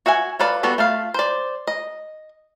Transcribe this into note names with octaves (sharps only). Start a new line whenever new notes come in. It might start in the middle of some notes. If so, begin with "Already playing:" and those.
F#4 E5 F#5 G#5
F4 A4 B4 D5
G3 B3 F#4 A4
A3 F4 F5
C5 D5
D#5